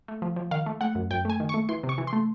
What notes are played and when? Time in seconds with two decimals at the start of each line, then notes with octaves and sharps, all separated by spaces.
0.08 A3
0.22 F3
0.36 F3
0.51 D#3 F5
0.66 A3
0.81 A3 F#5
0.95 F#2
1.10 F#2 G5
1.25 A3 G#5
1.40 D#3
1.49 A3 C#6
1.69 E3 C6
1.83 C3
1.89 C#6
1.98 E3
2.07 C6
2.13 A3